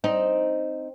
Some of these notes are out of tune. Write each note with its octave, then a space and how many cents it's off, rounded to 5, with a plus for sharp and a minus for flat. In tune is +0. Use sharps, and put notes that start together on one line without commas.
C4 +0 D#4 +0